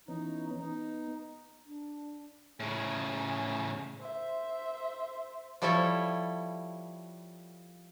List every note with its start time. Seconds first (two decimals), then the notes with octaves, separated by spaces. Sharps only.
0.08 E3 B3 C#4 D#4
0.60 B3 D#4
1.66 D4
2.60 A2 C#3 G#5
3.99 C5 E5
5.62 F3 G3 E4 A4 C#5 E5